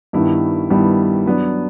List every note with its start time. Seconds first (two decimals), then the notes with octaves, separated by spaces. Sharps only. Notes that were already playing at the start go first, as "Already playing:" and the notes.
0.13 G2 D#3 G3 B3 E4
0.70 G2 D#3 G3 B3 E4
1.26 F#3 B3 D4